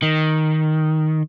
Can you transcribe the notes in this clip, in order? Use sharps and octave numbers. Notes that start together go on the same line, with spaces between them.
D#3